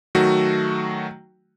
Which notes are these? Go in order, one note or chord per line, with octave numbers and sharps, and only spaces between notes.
D#3 F#3 A3 F#4